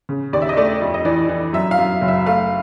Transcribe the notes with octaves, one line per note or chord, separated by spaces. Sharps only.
C#3
D#2 D5
E5
D#5
A3 D5
F2
D#5
E3 D5
E3
F#2 E5
F5
F#2
F#1
E5
A3 F5